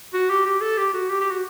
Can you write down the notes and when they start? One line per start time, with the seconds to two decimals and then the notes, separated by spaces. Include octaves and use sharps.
0.14 F#4
0.30 G4
0.46 G4
0.61 A4
0.78 G4
0.94 F#4
1.10 G4
1.21 G4
1.31 F#4